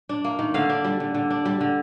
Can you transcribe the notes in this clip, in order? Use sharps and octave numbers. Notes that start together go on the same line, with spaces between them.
D4
A#3
D#3
D3 F5
D4
G3
D3
D3
D4
G3
D3